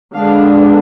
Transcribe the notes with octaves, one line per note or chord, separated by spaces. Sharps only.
D3 G#3 B3 D4 F5